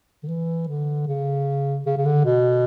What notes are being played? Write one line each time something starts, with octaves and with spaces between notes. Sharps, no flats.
D3
E3
D3
C#3
C#3
C#3
D3
B2